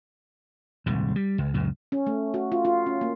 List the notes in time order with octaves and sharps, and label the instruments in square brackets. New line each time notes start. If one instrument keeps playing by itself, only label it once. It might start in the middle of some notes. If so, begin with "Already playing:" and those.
[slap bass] D#1 C2 G#2
G3
C#2
C#2 F#2 A#2
[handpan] C#4
A3
F#4
F4
F4
C#4
A#3